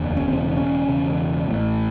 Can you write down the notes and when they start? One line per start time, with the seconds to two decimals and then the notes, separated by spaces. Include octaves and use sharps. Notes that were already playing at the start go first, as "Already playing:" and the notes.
Already playing: F1 D#2 D3
0.17 C#4
0.26 E1 E2 C#3 C4
0.57 C#4
0.87 E1 E2 C#3
1.47 A1 A2